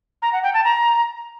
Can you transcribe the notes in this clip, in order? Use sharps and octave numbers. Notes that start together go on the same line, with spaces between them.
A#5
F#5
G5
A5
A#5